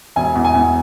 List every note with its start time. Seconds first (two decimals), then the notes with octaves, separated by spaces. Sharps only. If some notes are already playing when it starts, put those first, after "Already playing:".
0.16 E1 G#5
0.35 E2
0.45 G#5
0.55 E2